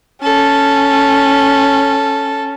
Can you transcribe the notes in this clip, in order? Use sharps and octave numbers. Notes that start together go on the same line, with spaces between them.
C#4 A4